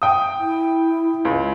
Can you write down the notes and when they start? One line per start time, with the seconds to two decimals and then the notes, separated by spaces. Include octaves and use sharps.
0.02 G5 D#6
0.39 E4
1.25 C#2